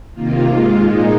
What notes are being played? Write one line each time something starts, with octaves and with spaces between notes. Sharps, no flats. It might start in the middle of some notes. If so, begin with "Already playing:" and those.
C3 D#3 A#3 F4
G#2 G#3 F4
A#2 G#3 D#4